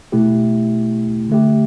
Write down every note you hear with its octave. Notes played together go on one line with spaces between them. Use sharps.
B2 A3 E4 G4
D3 A3 G4